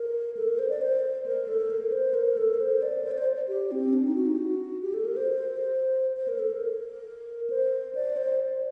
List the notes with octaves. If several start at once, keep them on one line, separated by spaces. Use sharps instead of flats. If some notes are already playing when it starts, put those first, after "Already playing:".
Already playing: A#4
A4
A#4
C5
D5
C5
A#4
A4
A#4
C5
A#4
A4
A#4
C5
D5
C5
D5
C5
G4
C4
D4
D#4
F#4
D#4
F#4
G4
A4
A#4
C5
C5
A#4
A4
A#4
C5
D5
C5